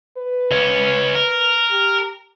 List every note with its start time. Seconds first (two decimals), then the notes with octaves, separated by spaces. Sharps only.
0.17 B4
0.51 C#2 C#4
1.15 A#4
1.70 G4